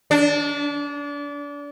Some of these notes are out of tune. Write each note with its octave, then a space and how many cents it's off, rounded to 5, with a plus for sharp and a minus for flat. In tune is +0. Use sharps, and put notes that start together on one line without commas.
D4 -30